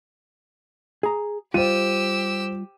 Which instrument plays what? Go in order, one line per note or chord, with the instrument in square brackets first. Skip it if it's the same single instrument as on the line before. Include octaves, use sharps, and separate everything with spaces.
[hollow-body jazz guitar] G#4 A#5
[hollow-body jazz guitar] G3 F4 [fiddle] G4 E6 [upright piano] C5 D#7